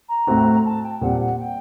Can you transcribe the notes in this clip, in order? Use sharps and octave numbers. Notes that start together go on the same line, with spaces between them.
A#5
A2 A3 C4 F#4
A5
G5
A#2 G3 C4 F#5
F#5
G5